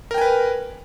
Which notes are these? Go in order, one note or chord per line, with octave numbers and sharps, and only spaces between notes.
A#4 B4 G5 G#5